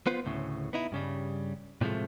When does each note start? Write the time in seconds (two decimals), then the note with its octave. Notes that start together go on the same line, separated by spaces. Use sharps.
0.07 B3 F4 B4 C5
0.25 D2 A2 C#3
0.73 B3 D#4 E4
0.92 G2 C#3 G3
1.81 A2 C3 F3 G#3 A3